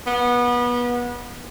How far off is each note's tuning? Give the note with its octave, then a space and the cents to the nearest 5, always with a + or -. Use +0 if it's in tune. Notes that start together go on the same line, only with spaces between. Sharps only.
B3 -25